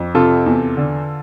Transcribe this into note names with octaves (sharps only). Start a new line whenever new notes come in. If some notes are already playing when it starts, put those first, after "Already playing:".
Already playing: F2
C3 F4 A4
E2
D3